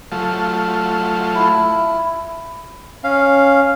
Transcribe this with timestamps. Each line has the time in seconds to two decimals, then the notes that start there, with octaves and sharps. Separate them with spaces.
0.12 F#3 A3 F4
1.35 E4
3.04 C#4 F5